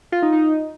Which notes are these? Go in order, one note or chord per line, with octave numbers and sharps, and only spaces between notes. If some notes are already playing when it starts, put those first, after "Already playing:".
F4
D#4
D#4